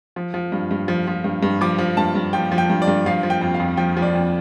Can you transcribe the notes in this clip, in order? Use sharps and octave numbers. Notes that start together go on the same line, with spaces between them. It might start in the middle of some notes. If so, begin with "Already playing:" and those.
F3
F3
G2
G2
F3
F3
G2
G2
F3 D6
F3
G2 A5
G2
F3 G5
F3
G5
G2
D5
G2
F3 F5
F3
G5
F2
F5
F2
F3 G5
F3
D5
F2